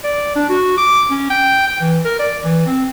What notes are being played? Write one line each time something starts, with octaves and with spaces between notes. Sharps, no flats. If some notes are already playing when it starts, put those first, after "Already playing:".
D5
D4
F#4
D6
C#4
G5
G5
E3
A#4
D5
E3
C4